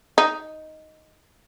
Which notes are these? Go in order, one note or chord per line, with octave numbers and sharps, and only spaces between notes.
D#4